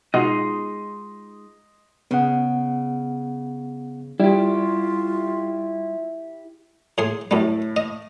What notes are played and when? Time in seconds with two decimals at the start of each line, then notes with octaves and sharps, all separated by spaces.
0.14 B2 G#3 D#4 F4 D#5 C6
2.11 C#3 B3 F#5
4.20 G3 E4 F4 G4
6.98 A2 G#4 C6
7.31 F#2 A2 G3
7.76 D#5